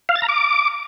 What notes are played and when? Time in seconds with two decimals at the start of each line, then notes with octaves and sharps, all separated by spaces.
0.09 F5
0.15 A6
0.22 A#5
0.29 D6